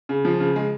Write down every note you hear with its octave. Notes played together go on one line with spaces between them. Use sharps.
C#3
F3
C#3
G#3